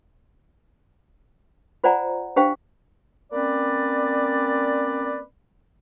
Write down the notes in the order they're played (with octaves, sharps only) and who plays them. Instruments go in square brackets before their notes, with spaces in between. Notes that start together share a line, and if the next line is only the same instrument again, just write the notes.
[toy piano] F4 C5 D5 F#5 G#5 A#5
D4 G4 C5 F5 G5
[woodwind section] A#3 C4 C#4 B4 D5